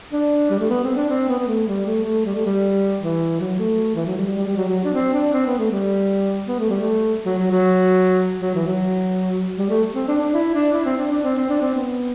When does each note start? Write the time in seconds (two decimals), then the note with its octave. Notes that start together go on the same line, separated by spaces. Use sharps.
0.12 D4
0.50 G3
0.60 A3
0.70 B3
0.83 C4
0.96 D4
1.09 C4
1.28 B3
1.39 B3
1.47 A3
1.67 G3
1.86 A3
2.04 A3
2.25 G3
2.35 A3
2.46 G3
3.01 E3
3.40 F#3
3.59 A3
3.95 E3
4.06 F#3
4.17 G3
4.36 G3
4.46 G3
4.56 F#3
4.69 F#3
4.84 D4
4.93 C4
5.13 D4
5.33 C4
5.46 B3
5.58 A3
5.71 G3
6.48 B3
6.59 A3
6.69 G3
6.81 A3
7.25 F#3
7.38 F#3
7.51 F#3
8.41 F#3
8.54 E3
8.66 F#3
9.57 G3
9.70 A3
9.94 C4
10.08 D4
10.21 D4
10.34 E4
10.53 D4
10.72 E4
10.85 C4
10.98 D4
11.11 D4
11.23 C4
11.37 C4
11.49 D4
11.62 C4
11.75 B3